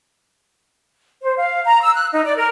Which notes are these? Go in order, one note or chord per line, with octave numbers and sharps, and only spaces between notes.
C5
F5
A#5
E6
F#6
D#4
D5
A#4